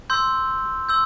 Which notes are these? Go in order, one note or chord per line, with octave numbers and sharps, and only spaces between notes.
C6 E6 G6
C6 E6 G6